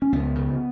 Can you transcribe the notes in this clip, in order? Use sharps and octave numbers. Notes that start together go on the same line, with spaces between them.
C#4
C#2 B3
C#3